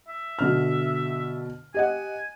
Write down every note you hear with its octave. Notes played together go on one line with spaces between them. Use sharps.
E5
B2 D3 F6
G4 D#5 F#5 G#5